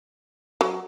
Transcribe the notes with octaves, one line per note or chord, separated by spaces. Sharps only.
F#3